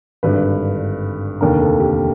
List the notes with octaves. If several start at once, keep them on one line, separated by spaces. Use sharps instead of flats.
G#1 G2 D3 B4
F1 D#2 D3 A#4
A4
G4